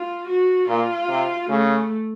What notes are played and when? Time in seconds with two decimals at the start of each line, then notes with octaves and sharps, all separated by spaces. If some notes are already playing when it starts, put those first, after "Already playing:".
Already playing: F4
0.27 F#4
0.68 A#2 F4
1.09 C3
1.49 C#3 A3